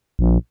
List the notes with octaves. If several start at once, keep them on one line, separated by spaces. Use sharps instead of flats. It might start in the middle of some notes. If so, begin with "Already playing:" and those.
A#1